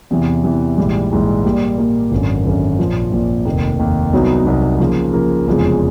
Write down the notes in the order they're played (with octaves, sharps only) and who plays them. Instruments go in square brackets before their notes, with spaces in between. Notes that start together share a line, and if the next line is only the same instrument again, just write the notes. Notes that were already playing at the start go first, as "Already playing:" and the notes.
[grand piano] E2 C3 E3
E2 C3 E3
A#1 G#2 E3 G3
A#1 G#2 E3 G3
A#2 G3 A#3
A#2 G3 A#3
G#1 F#2 D3
G#1 F#2 D3
A#1 A#2 F3
A#1 A#2 F3
F1 D#2 D#3
F1 D#2 D#3
C2 B2 F#3 B3 D#4
C2 B2 F#3 B3 D#4
C#3 F3 A#3
C#3 F3 A#3
F1 E2 C#3 F3 G#3